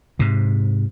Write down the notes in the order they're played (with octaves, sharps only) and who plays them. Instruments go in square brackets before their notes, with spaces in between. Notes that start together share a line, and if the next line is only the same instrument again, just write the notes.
[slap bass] G#2 C3